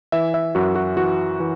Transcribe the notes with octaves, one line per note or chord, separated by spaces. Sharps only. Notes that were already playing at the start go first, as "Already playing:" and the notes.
E3 E5
E5
F#2 F#4
F#4
E3 F#4
E3